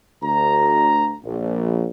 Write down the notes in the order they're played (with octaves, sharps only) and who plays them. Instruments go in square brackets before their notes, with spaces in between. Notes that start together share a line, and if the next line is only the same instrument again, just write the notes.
[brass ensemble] D2 A#5
A#1